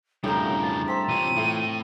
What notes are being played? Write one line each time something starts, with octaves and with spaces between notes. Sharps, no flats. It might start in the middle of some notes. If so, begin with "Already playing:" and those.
F2 A2 C#3 G3 D4 E4 A#4 G5
A5
C4 A5 A#5 B6
C2 C3 E3 F4 C#5 D#7
A2 A3